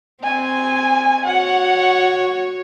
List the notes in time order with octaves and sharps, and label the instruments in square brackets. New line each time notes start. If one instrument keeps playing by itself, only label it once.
[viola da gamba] C4 [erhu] G#5
[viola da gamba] F#4 C#5 [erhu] F#5